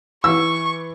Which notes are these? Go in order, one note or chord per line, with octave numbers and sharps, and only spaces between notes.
E3 C#6 E6